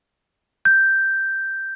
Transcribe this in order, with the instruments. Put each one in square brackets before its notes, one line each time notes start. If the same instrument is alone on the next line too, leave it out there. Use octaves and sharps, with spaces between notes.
[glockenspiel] G6